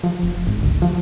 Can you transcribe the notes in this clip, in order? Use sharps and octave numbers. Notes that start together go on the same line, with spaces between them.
F3
F1
G#1
D2
F3